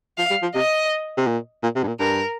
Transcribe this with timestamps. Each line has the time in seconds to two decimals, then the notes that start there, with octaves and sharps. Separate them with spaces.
0.18 F3 F5
0.30 G3
0.42 F3
0.55 C3 D#5
1.17 C3
1.27 A#2
1.63 A#2
1.76 C3
1.83 G2
1.87 A#2
1.99 G2 A#4